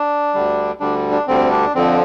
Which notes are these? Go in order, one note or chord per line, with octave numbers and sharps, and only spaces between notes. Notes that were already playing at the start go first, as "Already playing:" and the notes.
Already playing: D4
D2 D3 G3
D2 D3 G3 D4
D4
D2 D3 G3 C4
D4
F2 D3 F3 C4